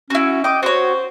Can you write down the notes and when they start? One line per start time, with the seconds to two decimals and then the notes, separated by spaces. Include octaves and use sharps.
0.10 C#4 E4 F#4
0.44 D#5 G5 D6
0.63 F#4 C5 C#5